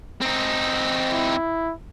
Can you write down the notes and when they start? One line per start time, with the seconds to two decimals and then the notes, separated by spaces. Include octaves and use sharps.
0.22 C4 D#4
1.12 E4